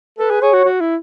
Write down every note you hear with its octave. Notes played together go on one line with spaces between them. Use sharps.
A4 B4
G#4
G#4 C#5
F#4
F#4
E4